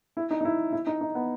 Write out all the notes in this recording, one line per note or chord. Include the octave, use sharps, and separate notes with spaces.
E4
D#4
D#4
E4
E4
D#4
D#4
B3